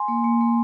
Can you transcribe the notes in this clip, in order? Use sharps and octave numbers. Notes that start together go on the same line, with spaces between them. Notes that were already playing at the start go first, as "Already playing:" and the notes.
Already playing: G#5 C6
A#3
A#3
A#3